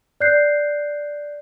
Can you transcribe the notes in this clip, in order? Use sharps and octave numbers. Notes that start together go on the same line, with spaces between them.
D5 F#6 G6 C7